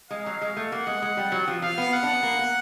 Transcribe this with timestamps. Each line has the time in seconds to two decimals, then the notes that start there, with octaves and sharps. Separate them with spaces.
0.10 G#3 F5
0.26 F#3
0.41 G#3
0.57 A3
0.72 A#3 F#5
0.87 G#3
1.02 G#3
1.17 G3
1.32 F#3
1.48 F3
1.62 F3 F5
1.78 B3
1.93 F#5
2.03 D4
2.13 B3
2.23 A#3
2.39 A#3